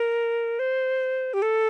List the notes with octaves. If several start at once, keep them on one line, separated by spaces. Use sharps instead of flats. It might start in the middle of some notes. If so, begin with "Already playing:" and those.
Already playing: A#4
C5
G4
A4